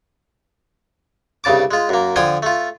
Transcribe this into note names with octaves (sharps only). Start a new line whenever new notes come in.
C2 G2 C#3 A5 D6
G#3 F4
F#2 A#3
D3 F3 G5 G#5 C6 D#6
A3 F4